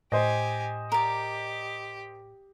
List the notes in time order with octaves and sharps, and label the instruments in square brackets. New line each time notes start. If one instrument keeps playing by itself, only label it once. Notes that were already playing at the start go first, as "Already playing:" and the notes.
[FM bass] A2 [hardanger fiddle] G4 G#5 [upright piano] C5 D#5
[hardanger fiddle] G4 [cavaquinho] A#4 D5